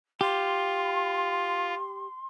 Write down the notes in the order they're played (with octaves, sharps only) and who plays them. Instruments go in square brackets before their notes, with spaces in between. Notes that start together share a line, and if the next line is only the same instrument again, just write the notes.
[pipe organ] F4 [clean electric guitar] G4 [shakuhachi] C6